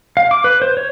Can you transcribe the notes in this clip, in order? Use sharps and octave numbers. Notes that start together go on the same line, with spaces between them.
F5
D6
B4
C5
C#5